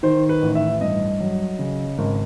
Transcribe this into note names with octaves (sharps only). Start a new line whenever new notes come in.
D#3 C5
B4
A1
E5
G2 D#5
F#3
C#3
G#1